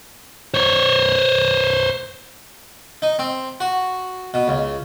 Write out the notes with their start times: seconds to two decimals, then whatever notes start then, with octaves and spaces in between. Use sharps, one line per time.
0.54 C5 C#5
3.02 D#4
3.19 C4
3.60 F#4
4.34 B2
4.48 C#2